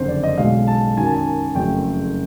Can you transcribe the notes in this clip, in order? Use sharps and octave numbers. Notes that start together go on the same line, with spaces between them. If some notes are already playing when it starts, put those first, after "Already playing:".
Already playing: F#1 F2 D3 C5
D5
D#5
B1 B2 G#3 F5
A5
F#2 D#3 F#3 G#5
A5
G#5
F#1 F2 C#3 F#3 A3 G5